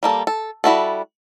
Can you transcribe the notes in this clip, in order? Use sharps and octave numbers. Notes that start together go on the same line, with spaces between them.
G3 A#3 A4
A4
G3 E4 F#4 A4